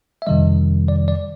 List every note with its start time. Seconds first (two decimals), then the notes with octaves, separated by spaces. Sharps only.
0.22 E5
0.27 F2 C3 D#3 G3 D#5
0.88 D5
1.08 D5